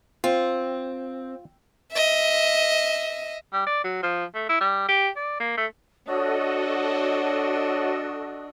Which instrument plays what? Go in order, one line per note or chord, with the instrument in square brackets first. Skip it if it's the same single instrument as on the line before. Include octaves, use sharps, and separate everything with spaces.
[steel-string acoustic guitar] C4 [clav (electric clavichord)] F4
[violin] D#5 E5
[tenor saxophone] G3
D5
F#3
F3
A3
E4
G3
G4
D5
A#3
A3
[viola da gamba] D4 [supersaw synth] F#4 A4 D#5 [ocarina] C#5